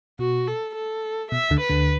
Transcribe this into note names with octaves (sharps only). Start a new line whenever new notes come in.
B2 F#4
A4
A4
B2 E5
D2 D3
B4
D2 D3